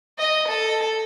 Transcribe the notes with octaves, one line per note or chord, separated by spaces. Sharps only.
D#5
A4